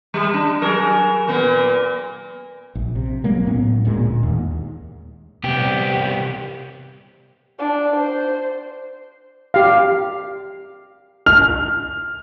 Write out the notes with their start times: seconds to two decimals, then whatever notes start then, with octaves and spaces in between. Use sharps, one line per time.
0.14 G3
0.34 D4
0.62 F#3 G#4 A#4
1.28 A#2 A#3 B3
2.75 A#1
2.96 C3
3.24 B1 F#3 G#3 A#3
3.47 A2 B3 C#4
3.85 D1 D2 A#2 G#3
4.23 D#2
5.44 C2 B3 G4
7.59 D4
7.96 C5
9.54 G4 F5
11.26 F6